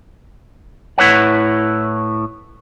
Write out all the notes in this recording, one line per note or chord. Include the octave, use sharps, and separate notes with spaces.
A2 E4 B4 C#5 F#5